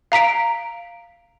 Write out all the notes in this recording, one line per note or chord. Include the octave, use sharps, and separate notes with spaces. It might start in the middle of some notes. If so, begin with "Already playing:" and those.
F5 A#5 B6 D7